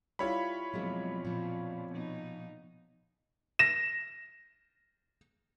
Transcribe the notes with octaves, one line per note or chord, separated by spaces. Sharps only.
G3 E4 F4 C#5 B5
F2 B2 F#3 G#3 A#3
A#2 F3
B2 D#4
A#6 E7